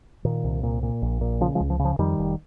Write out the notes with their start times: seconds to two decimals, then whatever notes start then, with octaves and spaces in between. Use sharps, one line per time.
0.25 A#2 D#3
0.44 C2
0.63 A#2
0.83 A#2
1.02 A#1
1.21 A#2
1.41 C#3 F3
1.55 F3 G#3
1.60 C#2
1.70 F3
1.79 C#3
1.85 F3
1.99 F2 D#3 G3
2.18 F1